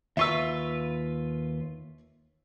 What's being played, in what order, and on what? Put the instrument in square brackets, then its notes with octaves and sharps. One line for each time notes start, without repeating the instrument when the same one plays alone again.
[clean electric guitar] D#2 F4 B4 [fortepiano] E5 C#6 E6